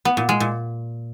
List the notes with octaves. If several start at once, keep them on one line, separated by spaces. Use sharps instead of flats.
B3
A#2
G#3
A#2